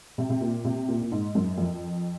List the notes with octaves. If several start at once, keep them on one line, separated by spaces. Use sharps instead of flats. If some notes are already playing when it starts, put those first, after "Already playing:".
C3
C3
A#2
C3
A#2
A#2
G#2
F#2
F2